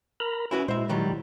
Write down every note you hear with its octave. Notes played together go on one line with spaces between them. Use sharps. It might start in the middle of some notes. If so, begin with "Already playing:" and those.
A#4 A#5 B5
C#4 E4 F#4 B4
A#2 G#3 E4 C5 E5
D#3 F#3 G3